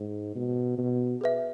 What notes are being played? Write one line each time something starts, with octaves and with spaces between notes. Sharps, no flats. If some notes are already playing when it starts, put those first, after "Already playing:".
Already playing: G#2
B2
B2
G#4 B4 E5